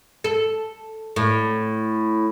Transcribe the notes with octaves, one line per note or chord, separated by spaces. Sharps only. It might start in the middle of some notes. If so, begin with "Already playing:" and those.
A4
A2